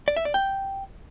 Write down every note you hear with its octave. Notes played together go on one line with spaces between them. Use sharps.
D5
E5
D5
G5